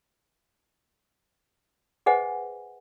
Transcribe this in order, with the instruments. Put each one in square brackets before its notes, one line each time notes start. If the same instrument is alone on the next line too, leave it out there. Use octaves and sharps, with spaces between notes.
[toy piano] G#4 B4 C5 D#5 F#5 G#5